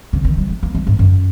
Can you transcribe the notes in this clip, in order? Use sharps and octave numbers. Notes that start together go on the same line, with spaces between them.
C#3
D#3
F#3
G#3
A#3
G#3
G#2
F#2